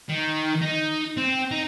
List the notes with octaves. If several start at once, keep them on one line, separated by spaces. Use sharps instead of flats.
D#3
D#4
C4
D#4